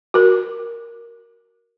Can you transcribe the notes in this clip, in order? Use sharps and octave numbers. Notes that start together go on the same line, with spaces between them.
F#4 A#4